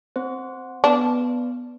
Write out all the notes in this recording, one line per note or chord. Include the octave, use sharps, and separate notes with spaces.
C4 C5
B3 D4 B4